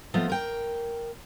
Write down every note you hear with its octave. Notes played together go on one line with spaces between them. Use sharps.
F3 A3 B3 F4 D#5
A#4 G5